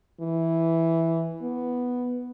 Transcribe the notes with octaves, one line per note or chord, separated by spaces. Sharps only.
E3
B3